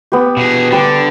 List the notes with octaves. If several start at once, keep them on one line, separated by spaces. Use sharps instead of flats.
B3 G4
B2 G#4
D3 G3 D4